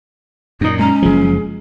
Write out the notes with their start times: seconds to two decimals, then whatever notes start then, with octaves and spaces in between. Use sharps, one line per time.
0.61 F#2 A#2 D#4
0.79 G#3 C#4 A#5
1.02 F#1 F3 G#4